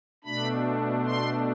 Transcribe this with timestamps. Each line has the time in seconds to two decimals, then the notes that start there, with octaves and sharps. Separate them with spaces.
0.24 B2 A3 D4 B5
1.05 C6